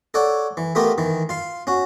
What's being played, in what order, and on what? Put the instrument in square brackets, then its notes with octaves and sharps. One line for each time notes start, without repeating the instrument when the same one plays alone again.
[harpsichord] A4 C#5 D5 F#5
E3
A3 B3 F4 G4 A#4
D#3 E3
F4 F5
C#4 F#4